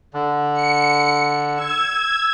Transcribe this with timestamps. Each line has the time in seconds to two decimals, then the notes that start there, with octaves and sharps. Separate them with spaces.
0.14 D3
0.53 C#7
1.54 E6 G#6